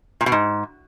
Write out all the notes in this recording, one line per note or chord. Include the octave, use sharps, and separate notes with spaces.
A#2
B2
G#2